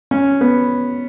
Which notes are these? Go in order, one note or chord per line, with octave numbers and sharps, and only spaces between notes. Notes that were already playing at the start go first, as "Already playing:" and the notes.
C#4
B3